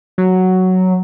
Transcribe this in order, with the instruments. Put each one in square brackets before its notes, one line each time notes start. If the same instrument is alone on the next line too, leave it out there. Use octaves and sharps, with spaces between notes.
[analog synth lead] F#3